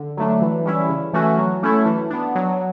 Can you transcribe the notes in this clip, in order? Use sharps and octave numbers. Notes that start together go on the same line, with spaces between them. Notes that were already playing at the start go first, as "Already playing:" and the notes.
Already playing: D3
F#3 A3 D4
E3
G3 C#4 E4
C#3
E3 A3 C#4 F#4
F#3
A3 C#4 E4 A4
E3
B3 D4
F#3